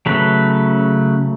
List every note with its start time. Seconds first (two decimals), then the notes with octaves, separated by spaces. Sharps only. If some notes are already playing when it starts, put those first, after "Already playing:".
0.06 C#3 F#3 A3 B4